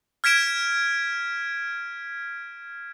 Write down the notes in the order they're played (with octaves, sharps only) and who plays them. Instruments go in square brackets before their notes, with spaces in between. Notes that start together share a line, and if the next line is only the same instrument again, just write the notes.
[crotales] F6 G#6 B6 D7 E7